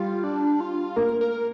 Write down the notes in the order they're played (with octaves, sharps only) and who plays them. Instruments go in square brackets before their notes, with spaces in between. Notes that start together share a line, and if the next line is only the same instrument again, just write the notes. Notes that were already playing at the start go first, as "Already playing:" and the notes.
Already playing: [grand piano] G3 [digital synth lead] F4
[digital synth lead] D4
F4
[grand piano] A#3 [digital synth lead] A#4
[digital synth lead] A#4